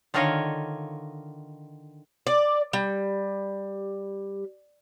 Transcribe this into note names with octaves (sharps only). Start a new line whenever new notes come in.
D3 D#3 F4 C#5 D#5 F5
D5
G3